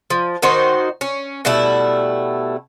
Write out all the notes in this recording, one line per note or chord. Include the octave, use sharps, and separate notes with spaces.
F3
D#3 D#4 F#4 C5
C#4
B2 G3 A3 E4